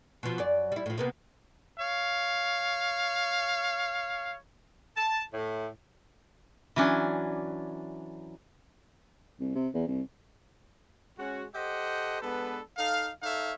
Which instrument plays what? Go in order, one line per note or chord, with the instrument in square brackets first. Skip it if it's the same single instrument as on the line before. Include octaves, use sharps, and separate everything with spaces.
[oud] B2 F3
F#2 F#3 D5
G3 E4
A2 F3
C3 A#3 B3
[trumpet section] C#5 F5
[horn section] A5
A2
[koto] E3 F#3 C#4 D4
[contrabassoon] C2
C3
E2
C2
[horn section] G#3 C#4 F#4
G4 A4 C5 D#5 F#5
G#3 B3 D4 A4 B4
D#4 A4 F5
D#4 A4 C#5 E5 F5